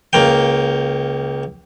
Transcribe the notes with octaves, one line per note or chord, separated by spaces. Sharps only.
C#2 A#3 G5